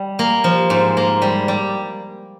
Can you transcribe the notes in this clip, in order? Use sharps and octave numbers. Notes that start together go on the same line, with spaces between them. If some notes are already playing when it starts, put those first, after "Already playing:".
Already playing: G3
A#3
F3
G#2
A#3
G3
G3